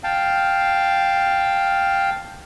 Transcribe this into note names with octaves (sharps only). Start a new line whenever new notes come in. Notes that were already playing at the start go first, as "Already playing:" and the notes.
F5 G5 A5